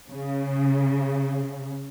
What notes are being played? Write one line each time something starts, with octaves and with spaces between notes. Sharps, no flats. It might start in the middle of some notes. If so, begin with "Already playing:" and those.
C#3